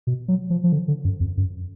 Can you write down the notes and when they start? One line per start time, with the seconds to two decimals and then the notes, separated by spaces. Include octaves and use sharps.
0.07 B2
0.28 F#3
0.50 F3
0.64 F3
0.72 D3
0.88 D3
1.05 F#2
1.20 F2
1.37 F#2